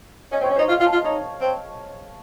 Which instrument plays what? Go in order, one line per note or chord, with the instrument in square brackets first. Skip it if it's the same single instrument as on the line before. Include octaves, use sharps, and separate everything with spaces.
[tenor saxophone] C#4 [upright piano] D#5
[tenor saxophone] C4
[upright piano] C#5
[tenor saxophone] C#4
[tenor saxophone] D#4 [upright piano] C5
[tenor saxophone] F4 [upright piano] D#5
[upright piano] F5
[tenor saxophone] F4
[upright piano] A5
[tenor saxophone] F4
[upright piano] D#5
[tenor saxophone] D#4 [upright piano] C#5
[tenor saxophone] C4